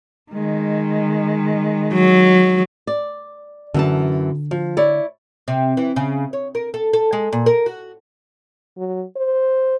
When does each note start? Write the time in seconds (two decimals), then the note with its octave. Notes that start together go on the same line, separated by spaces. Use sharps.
0.32 D#3 G#3
1.93 F#3
2.87 D5
3.74 F#2 D3 E3 A5
4.51 F3
4.77 E4 C#5 D5
5.48 C3
5.77 E3
5.96 C#3
6.33 C#5
6.55 A#4
6.74 A4
6.93 A4
7.13 G#3
7.33 A#2
7.46 A#4
7.66 F#4
8.77 F#3
9.16 C5